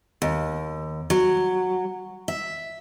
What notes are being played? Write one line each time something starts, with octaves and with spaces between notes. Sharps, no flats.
D#2
F#3
E5